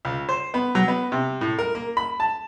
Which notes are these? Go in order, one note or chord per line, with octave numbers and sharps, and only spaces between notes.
C#2
C5
B3
F#3
B3
C3
A2
A#4
A#3
B5
A5